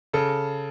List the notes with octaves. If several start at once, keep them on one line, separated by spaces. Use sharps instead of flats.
C#3 A4